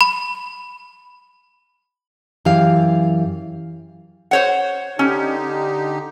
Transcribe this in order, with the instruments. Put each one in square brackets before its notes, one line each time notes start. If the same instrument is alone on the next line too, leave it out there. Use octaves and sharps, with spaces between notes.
[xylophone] B5
[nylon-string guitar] F#2 E3 G4 F5
[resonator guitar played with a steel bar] C5 C#5 F#5
[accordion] D3 D#4 G4 [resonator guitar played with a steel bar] C#4